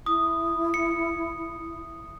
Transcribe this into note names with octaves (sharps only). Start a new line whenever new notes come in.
E4 D#6
C#7